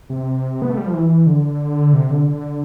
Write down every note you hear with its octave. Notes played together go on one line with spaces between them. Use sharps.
C3
B3
A3
G3
F3
E3
D3
C3
D3
D3